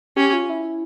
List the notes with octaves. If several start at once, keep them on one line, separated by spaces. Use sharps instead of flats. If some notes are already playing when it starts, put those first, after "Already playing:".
C#4 G4
F4
E4